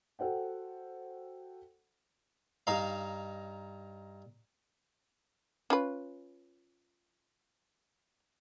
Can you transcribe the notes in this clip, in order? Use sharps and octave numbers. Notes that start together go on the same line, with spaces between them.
F#4 A4 C5 F#5 G5
G2 D#4 F5
C#4 F4 B4